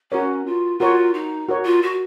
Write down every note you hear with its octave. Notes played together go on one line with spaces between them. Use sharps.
C#4 F#4 A#4 C#5
F4
F4 F#4 A#4 C#5
D#4
F#4 A#4 C#5
F4
F#4